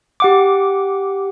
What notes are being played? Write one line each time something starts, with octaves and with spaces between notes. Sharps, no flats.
G4 F#5 D6